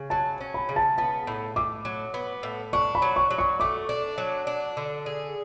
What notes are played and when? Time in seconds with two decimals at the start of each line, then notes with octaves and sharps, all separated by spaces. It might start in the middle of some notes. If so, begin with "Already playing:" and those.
Already playing: C#3
0.10 F#3 A5
0.40 C#4
0.54 B5
0.69 C#3
0.76 A5
0.98 B3 A5
1.27 A2
1.56 A2 D6
1.85 F#3
2.14 B3
2.43 A2
2.73 D4 C#6
2.95 B5
3.02 F#3
3.16 C#6
3.31 F#3
3.38 C#6
3.60 A3 D6
3.89 D4
4.18 F#3
4.47 D4
4.77 D3
5.06 G#4